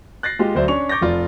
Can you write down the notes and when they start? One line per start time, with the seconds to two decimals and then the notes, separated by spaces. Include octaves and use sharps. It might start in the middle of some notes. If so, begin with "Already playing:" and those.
0.23 F#6 A6 A#6 C7
0.39 G#3 F4 G4
0.55 D2 F#3 C5 D5 E5
0.68 C#4 D4 C#6 F7
0.89 C#6 D6 G6 A6 A#6
1.01 F1 F4 D5